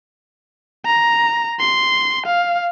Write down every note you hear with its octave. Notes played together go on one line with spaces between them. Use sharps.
A#5
C6
F5